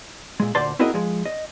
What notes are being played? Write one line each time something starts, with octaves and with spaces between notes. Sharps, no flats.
A#2 G#3
D2 A#2 C5 D5 A5 C6
C4 E4 F#4 G#4 A#4 D#5
F3 G#3
D#5